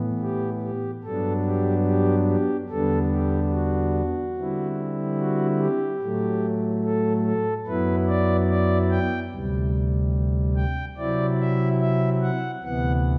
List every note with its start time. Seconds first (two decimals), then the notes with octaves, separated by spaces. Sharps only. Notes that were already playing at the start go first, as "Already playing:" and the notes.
Already playing: A2 E3 B3
0.21 G4
0.62 G4
1.04 G2 F#3 B3 D4 A4
1.45 G4
1.86 G4
2.28 G4
2.69 E2 D3 G3 B3 D4 A4
3.11 G4
3.52 F#4
4.35 D3 G3 C4 E4
5.18 F#4
5.59 G4
6.01 A2 F#3 A3
6.84 A4
7.25 A4
7.66 F#2 F#3 B3 E4 B4
8.08 D5
8.49 D5
8.90 G5
9.32 D2 C3 G3
10.56 G5
10.97 C3 F#3 C4 E4 D5
11.39 E5
11.80 E5
12.22 F#5
12.63 D2 C3 E3 B3 F#5